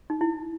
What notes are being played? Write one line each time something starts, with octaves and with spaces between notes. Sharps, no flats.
D#4
E4